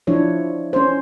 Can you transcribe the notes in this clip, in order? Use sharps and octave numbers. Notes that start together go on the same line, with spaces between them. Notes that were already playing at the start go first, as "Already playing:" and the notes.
F3 D4 E4 C#5
C#4 C5